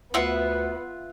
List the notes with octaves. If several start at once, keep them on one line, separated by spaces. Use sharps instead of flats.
D2 B3 F4 E5 F#5